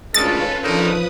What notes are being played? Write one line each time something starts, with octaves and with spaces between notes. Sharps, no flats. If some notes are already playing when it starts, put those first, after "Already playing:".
D2 D#3 G#3 C#4 F4 A4 B4 A6
D3 D#3 F3 D#4 A4 B4 D#6